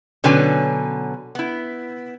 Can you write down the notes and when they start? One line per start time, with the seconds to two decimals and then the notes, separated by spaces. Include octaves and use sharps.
0.24 B2 D3 F#3 C#4 B4 G#5
1.35 B3 E4